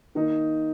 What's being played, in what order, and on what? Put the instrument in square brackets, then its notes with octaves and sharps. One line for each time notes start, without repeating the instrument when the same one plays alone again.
[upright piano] D#3 A#3 D#4